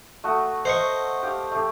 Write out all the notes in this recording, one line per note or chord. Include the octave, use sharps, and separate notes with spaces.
A3 F#4 D#6
C5 D#5 C#6
G4 F5
A3 G4